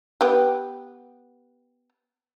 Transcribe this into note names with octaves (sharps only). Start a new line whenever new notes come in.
B3 G4